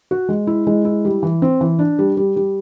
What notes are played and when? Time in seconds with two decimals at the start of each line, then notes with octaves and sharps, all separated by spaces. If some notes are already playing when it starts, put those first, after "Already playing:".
0.11 F#4
0.29 G#3
0.47 E4
0.67 G#3
0.85 E4
1.05 G3
1.23 E3
1.42 C4
1.61 E3
1.79 D4
1.99 G3
2.17 G3
2.36 G3